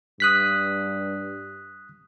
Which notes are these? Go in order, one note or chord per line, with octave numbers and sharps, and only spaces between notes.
G2 D#6 F#6 B6